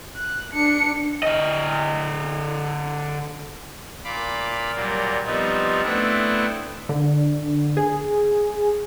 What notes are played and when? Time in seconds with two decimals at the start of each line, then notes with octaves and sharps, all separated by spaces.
0.16 F#6
0.54 D4 C#7
1.23 D3 D#5
4.04 A#2 F5 B5 D6
4.75 A#2 F#3 G3 A#3
5.25 F3 G3 B3 C4 D#4
5.83 A3 B3 C4 D4 E4
6.89 D3
7.77 G#4